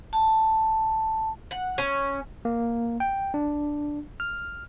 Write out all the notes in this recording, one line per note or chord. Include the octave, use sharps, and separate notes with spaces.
A5
F#5
C#4
A#3
G5
D4
F6